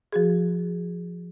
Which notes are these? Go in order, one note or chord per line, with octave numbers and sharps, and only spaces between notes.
F3 F#4 G#4